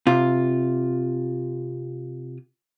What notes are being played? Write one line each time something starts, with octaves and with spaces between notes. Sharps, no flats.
C3 F4